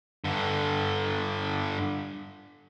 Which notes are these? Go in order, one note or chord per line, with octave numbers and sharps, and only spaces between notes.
G2 D3